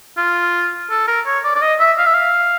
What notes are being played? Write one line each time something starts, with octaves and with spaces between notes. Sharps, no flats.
F4
A4
A#4
C#5
D5
D5
D#5
E5
F5
E5
F5